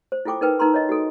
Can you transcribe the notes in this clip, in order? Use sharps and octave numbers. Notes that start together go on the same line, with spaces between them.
C5
E4 F4 A4 G5 D6
D#4 A#4 B4 G5
D#4 A#4 B4 A#5 C6
C#5 D#5
F#4 A4